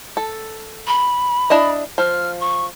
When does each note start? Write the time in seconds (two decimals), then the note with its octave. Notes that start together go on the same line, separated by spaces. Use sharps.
0.17 A4
0.87 B5
1.50 D4 E4 D#5
1.98 F3 F6
2.40 C#6